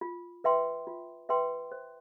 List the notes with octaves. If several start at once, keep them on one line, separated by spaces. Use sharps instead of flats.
F4
B4 E5 G5 C6
F4
B4 E5 G5 C6
C5